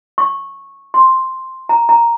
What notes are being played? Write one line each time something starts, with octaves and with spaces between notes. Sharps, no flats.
C#6
C6
A#5
A#5